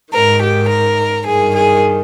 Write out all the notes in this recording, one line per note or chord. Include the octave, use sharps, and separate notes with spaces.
G#2 D#3 A#4
G4
A#4
G2 D#3 G#4
G#4